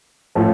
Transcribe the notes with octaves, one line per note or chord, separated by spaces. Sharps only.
A2 F3 A3 C#4 F4